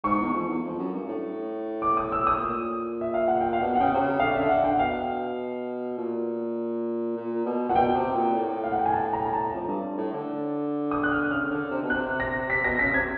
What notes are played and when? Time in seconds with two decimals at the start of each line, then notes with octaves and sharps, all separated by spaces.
0.04 G#2 C#6
0.20 E2
0.34 F2
0.49 E2
0.64 F2
0.79 F#2
0.94 G2
1.08 A2
1.82 D6
1.97 D#6
2.12 E6
2.27 D#6
2.42 A#2
3.01 E5
3.14 F5
3.28 F#5
3.41 G5
3.53 F5
3.60 B2 F#5
3.76 F#5
3.80 C#3 G5
3.94 C3
3.99 C#3
4.20 D3 F5
4.34 E5
4.39 D3
4.49 F#5
4.64 G5
4.73 F#5
4.79 B2 F5
5.97 A#2
7.16 A#2
7.45 B2
7.69 A#2 F#5
7.75 B2 G5
7.95 C3
8.15 A#2
8.34 A2
8.64 F5
8.72 F#5
8.78 G5
8.86 G#5
8.94 A5
9.13 A#5
9.26 A#5
9.33 A5
9.53 F2
9.67 G2
9.97 A2
10.13 D3
10.91 D#6
11.04 F#6
11.12 F6
11.30 C#3 F6
11.51 D3
11.71 C3
11.82 B2
11.90 C3 F#6
12.20 A#6
12.49 C3 B6
12.64 B2 A#6
12.79 C#3 B6
12.94 C3 G#6